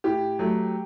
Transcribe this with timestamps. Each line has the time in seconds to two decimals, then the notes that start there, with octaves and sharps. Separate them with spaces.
0.04 A2 G4
0.39 F#3 A3